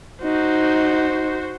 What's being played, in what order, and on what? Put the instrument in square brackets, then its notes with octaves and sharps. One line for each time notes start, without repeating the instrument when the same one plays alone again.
[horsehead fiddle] D#4 [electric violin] F#4 C5